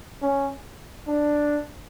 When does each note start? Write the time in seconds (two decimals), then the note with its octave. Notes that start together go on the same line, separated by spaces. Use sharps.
0.22 C#4
1.08 D4